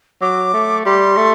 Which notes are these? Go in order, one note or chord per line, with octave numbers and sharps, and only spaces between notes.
F#3 D6
A3
G3 C6
A3